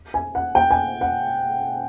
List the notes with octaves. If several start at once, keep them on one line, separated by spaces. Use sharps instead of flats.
G#5
F#5
G5
G#5
F#5